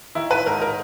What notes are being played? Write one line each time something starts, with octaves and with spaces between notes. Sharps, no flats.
D#3 E4
B4
G#2 A#4
A#4